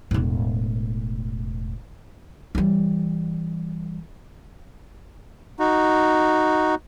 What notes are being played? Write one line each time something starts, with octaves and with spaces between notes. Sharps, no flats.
E1 A2
E3 G3
D#4 F#4